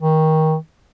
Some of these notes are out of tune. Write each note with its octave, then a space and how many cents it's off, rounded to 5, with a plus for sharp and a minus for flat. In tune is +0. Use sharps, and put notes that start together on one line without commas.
D#3 +20